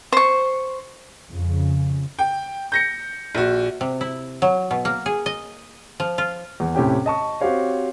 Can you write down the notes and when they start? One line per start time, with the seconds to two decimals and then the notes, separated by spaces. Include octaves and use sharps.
0.12 C5 C#6
1.30 F2 C#3
2.19 G5
2.72 G6 A#6 C#7
3.35 A#1 F#4
3.81 C3
4.01 E4
4.42 F#3
4.71 B2
4.85 A#3
5.06 G#4
5.26 D#5
6.00 F3
6.18 F4
6.60 E2
6.75 A2 C3 C#4 G4 G5
7.06 D#5 A5 C#6
7.41 C4 F#4 G4 C5 C#5 F5